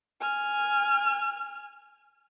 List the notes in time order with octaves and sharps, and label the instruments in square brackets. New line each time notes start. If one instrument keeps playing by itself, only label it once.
[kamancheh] G#5 F6